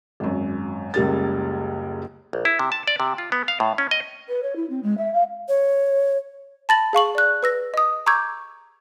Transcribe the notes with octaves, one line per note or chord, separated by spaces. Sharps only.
G#1 F#2
F#1 C#2 G3 A#4 A6
A#1
E4
C3
A5
D5
C3
F4
B3
F5
A2
C#4
D#5
B4
C#5
E4
C4
G#3
E5
F5
C#5
A5 B5 A6 A#6 F#7
G#4 F5 C#6 F#7
D5 F#6
B4 E6 A#6
D#5 D#6
A#5 C#6 D6 E6 G6 G#6